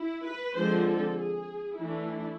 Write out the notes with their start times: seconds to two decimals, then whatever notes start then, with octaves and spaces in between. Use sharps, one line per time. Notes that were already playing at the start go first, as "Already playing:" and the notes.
Already playing: E4
0.25 B4
0.55 D3 F3 G#3 C4 C5
0.86 A4
1.17 G#4
1.78 E3 A3 D4 E4